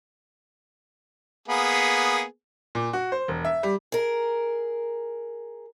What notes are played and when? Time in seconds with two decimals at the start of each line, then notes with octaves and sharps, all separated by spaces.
1.48 A#3 B3 G#4
2.75 A#2
2.93 F#4
3.12 C5
3.28 E1
3.45 E5
3.63 G3
3.92 G#4 A#4